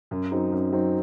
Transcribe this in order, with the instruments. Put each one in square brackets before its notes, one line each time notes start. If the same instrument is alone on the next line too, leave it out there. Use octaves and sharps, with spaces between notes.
[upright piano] F#2
F#3 C4 D#4
F#2
F#3 C4 D#4